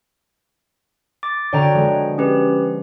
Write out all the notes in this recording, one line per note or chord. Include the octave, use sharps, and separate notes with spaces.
D6 A6
D3 F#4 C#5 G5 A#5
F3 G#3 B3
C#4 G4 B4